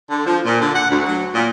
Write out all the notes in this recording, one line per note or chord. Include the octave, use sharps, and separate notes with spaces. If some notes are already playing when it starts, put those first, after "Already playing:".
D3
F3
A#2
D3
F#5
D2
F#3
A#2